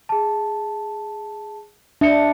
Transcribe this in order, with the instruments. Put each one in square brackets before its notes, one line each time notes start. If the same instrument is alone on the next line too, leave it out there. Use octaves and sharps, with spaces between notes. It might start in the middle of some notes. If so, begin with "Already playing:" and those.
[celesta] G#4 A5
[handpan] D4 [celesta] E5 C#7